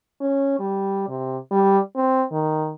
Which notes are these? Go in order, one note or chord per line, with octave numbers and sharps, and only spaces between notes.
C#4
G3
C3
G3
C4
D#3